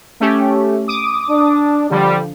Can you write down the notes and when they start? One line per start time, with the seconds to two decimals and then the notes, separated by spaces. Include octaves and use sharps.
0.20 A3 C#4 G4
0.88 D6 D#6
1.30 D4
1.91 D3 F3 G3